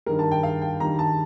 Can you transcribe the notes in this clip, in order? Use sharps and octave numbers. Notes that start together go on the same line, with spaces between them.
G2 D#3 G3 A#4
A5
G5
F5
G5
G2 D#3 G3 A#5
A5